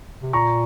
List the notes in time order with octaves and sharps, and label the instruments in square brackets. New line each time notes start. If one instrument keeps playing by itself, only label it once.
[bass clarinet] C3
[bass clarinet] A#2 [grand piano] A#5 C#6